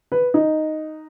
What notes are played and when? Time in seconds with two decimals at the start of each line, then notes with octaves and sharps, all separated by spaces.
0.12 B4
0.34 D#4